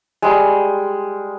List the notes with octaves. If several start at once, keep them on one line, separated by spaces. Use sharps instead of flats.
G3 G#3